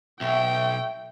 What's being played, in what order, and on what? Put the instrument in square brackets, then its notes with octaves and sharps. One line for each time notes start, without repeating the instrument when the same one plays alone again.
[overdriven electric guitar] B1 [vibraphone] E5 C#6 E6 [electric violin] G5